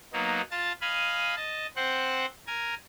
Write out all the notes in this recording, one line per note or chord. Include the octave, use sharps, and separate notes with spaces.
F#3 A#3 B3 D#4
F4 A5 A6
D#5 F5 G#5 B5
D#5 A5
C4 C5 F#5
A#4 G#5